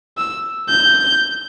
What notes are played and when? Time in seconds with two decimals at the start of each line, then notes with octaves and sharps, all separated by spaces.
0.17 E6
0.69 G6